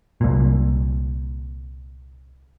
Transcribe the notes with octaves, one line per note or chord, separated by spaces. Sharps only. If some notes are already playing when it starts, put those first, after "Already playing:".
C2 A#2